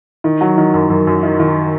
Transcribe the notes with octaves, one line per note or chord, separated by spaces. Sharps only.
D#3
F#3
D#3
F#2
F#2
F#2
D#3
D#3